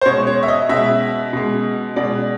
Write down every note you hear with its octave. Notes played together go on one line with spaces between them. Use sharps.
C5
B2 G#3 C#5
C#5
E5
D#5
B2 G#3 E5
B2 G#3
B2 G#3 D5